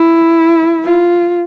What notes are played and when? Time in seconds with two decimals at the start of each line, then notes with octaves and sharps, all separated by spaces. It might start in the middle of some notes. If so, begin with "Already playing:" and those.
Already playing: E4
0.85 F4